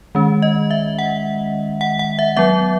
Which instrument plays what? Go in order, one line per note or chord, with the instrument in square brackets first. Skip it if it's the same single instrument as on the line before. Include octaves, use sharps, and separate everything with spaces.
[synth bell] D#3 G#3 C#4
D#5
E5
F#5
F#5
F#5
E5
F#3 B3 E5